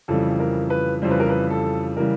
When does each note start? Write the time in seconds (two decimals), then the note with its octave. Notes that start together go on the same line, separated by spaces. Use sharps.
0.08 F2 C#3 E3 G3 A4
0.40 A#4
0.70 B4
1.02 F2 C#3 E3 G3 C5
1.11 B4
1.20 A#4
1.30 B4
1.50 A4
1.97 C#3 E3 G3 A#4